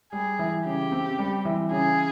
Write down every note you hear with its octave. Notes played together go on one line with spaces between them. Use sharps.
G3 G#4
E3
C#3 G4
C4
G3
E3
C#3 G#4